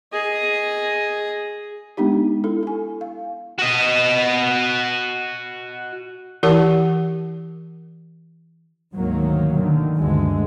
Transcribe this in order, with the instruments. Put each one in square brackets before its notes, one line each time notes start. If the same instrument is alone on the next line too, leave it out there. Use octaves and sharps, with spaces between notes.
[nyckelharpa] G#4 D#5
[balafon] G#3 B3 D4 D#4 G4
E4 A4
A4 G#5
F5
[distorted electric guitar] F#4 D#5
[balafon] E3 E4 G4 A#4 F#5 A5
[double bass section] D2 G#2 D#3 F#3 A#3
D3 D#3
D2 G2 D3 G#3